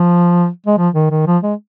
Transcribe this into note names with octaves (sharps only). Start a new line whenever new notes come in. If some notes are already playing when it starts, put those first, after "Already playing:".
Already playing: F3
G#3
F3
D#3
D#3
F3
G#3